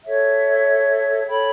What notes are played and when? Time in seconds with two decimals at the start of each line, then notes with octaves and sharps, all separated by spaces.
0.06 A4 C#5 E5
1.26 A4 C#5 G5 B5